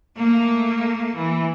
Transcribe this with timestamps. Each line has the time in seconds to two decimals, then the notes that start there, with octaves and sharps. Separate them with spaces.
0.17 A3 A#3
1.15 E3